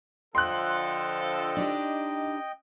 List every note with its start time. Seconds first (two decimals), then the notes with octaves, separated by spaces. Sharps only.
0.35 D3 F3 A4 D#5 G5 C6 F#6
1.57 D4 D#4 G4